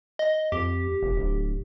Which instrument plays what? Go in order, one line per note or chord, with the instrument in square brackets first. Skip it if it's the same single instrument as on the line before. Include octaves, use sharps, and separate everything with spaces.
[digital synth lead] D#5
[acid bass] F2 [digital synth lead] G4
[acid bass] F1
D1